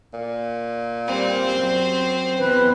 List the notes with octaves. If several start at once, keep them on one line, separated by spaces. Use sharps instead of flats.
A#2
G3 C4
F#2 C5
E2 E3 B4